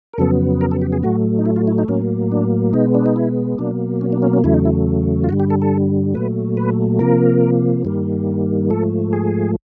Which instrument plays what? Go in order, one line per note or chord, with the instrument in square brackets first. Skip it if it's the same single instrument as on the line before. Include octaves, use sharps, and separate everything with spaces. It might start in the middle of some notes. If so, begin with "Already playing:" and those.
[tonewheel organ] A#4
F2 C#3 F#3 B3 A4
A#4
A4
G4
G#4
A2 F#3 A3 F#4
D#4
E4
F4
E4
D#4
A2 F#3 A#3 C#4
D4
B2 G#3 B3 D#4
D4
D#4
E4
B2 F#3 A#3 D4
C#4
D4
C#4
C#4
E2 C#3 F#3 A3 E4
D#4
E4
F4
G2 D3 G3 F#4
G4
A4
A4
A#2 F#3 A3 B4
B4
C3 F3 A#3 A#4
G2 D#3 G3 A#3
G#2 F3 A3 A4
G#4